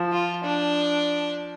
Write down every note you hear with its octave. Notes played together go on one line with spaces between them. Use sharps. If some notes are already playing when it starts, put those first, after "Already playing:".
Already playing: F3
F4
D4